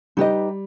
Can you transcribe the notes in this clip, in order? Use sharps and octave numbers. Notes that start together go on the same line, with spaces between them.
G3 D#4 G4 B4 D#5